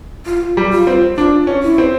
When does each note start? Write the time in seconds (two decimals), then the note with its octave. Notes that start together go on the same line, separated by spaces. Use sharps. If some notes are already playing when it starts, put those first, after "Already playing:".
0.26 F4
0.57 G3
0.72 F4
0.87 C4
1.17 D4 F4
1.47 C#4
1.63 E4
1.78 C4